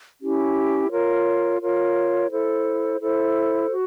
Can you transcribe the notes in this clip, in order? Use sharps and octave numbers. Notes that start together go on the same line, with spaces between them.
C#4 E4 G4
F4 A#4 C#5
F4 A#4 C#5
E4 A4 C5
E4 A4 C5
F#4